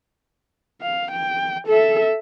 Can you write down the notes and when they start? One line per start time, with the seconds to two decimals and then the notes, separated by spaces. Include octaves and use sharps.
0.82 F5
1.12 G5
1.68 A4 E5